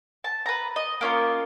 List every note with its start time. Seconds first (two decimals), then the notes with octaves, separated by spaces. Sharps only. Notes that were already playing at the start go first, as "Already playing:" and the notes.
0.24 A5
0.46 B4 A#5
0.76 D#5
1.01 A#3 C#4 F4 A#4